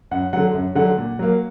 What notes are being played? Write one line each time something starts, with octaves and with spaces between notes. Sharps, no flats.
F#2 F#5
D3 F#3 F#5
F#2
D3 F#3 F#5
A#2
F#3 A#3